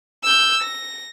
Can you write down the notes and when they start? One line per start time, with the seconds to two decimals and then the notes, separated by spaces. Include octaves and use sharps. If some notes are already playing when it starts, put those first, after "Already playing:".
0.23 E6 G6
0.62 A#6